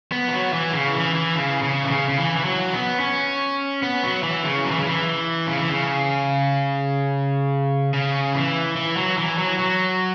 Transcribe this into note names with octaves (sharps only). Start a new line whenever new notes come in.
B3
E3
F#3
E3
C#3
E3
E3
C#3
C#3
E3
C#3
C#3
E3
E3
F#3
B3
C#4
B3
F#3
E3
C#3
F#3
E3
C#3
E3
C#3
E3
C#3
C#3
E3
E3
F#3
E3
F#3
F#3